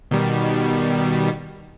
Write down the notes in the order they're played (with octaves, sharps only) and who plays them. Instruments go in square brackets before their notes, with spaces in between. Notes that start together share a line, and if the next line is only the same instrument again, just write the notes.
[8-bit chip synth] B2 D#3 G3